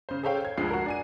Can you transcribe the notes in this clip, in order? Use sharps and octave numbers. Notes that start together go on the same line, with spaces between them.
C#3 C5
G#4 A4 C5 C#5 F5 G5
G#6
D2 F3 G#3 C7
F#4 A#4
D4 G#5 D#7